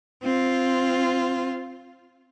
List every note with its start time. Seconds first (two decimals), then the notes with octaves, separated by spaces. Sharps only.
0.23 C4 F4